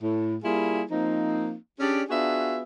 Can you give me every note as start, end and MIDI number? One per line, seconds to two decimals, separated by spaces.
0.01 0.36 45
0.43 0.82 55
0.43 0.82 58
0.43 0.82 64
0.43 0.82 65
0.43 0.82 68
0.91 1.54 53
0.91 1.54 58
0.91 1.54 60
0.91 1.54 63
1.80 2.02 61
1.80 2.02 62
1.80 2.02 67
1.80 2.02 68
1.80 2.02 74
2.10 2.63 59
2.10 2.63 62
2.10 2.63 65
2.10 2.63 66
2.10 2.63 68
2.10 2.63 76